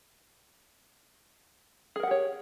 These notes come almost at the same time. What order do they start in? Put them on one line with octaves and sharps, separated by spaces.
G#4 A#4 F#5 G4 C#5